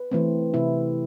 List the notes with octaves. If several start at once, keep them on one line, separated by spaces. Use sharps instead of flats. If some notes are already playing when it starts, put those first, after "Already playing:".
Already playing: B4
E3 A3 C4
C3 E4